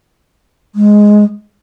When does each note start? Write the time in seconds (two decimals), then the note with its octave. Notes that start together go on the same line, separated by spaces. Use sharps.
0.75 G#3